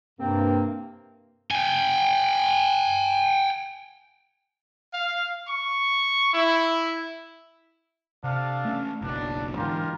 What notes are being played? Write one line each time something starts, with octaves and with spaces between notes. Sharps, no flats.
G2 C3 A#3 C4
G5 G#5
F5
C#6
E4
C3 D4 A4 F5
A3 C#4
F#1 B1 B2 D4
G#2 D3 E3 F4 G4 A#4